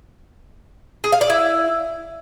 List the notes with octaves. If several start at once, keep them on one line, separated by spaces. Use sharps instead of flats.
G#4
F5
D5
E4